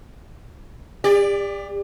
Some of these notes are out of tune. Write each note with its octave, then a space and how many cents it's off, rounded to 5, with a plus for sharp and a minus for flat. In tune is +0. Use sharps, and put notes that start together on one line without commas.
G4 +40 D5 +0